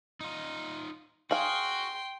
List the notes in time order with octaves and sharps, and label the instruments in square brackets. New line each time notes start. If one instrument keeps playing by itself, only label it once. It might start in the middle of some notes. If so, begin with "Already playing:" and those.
[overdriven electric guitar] D#4 F4
[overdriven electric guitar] F#4 [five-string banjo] G#4 F5 [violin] G5 C6